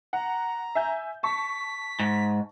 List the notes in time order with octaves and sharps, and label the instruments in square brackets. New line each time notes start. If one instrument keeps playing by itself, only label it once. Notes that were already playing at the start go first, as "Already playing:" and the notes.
[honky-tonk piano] F#5 [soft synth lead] A#5
[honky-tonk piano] E5 G#5 G6
[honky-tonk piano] A5 C#6 [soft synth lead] B6
[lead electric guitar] G#2